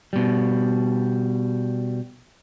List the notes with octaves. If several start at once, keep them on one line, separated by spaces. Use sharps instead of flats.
B2 G3